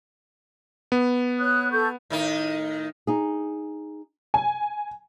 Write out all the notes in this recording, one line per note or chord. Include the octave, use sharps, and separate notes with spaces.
B3
C#5 D#6 F#6
A4 C#6 G6
A2 D#3 D#4
D#4 G#4
G#5